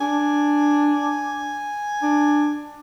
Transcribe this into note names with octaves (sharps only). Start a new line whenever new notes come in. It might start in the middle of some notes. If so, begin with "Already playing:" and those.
D4 G#5
D4